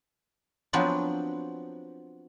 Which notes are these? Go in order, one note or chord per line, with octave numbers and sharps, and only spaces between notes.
F3 F#3 B3 C4 D4